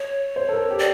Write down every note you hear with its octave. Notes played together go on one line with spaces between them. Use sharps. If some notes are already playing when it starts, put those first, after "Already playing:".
Already playing: C#5
C5
A4
A#4
G4
D5